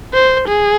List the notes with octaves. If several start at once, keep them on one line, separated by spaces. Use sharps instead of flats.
C5
G#4